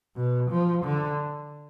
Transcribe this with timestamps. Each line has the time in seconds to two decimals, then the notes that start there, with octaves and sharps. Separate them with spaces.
0.16 B2
0.51 F3
0.85 D3